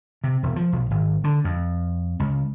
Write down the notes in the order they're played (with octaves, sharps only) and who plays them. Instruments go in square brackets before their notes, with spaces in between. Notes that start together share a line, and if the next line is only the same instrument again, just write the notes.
[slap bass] C3
E1
F3
B1
G#1
D3
F2
C#2